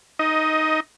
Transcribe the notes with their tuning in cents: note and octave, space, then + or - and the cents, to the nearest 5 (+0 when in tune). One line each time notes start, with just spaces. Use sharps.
D#4 +5 D#5 +20